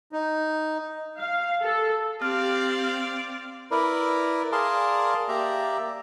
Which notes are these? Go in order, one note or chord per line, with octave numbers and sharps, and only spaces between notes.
D#4
F5
A4
C4 G4 D5 F5 F6
E4 A#4 B4 D5
G#4 A#4 D5 F5 A5 C6
A#3 G4 D5 E5 A#5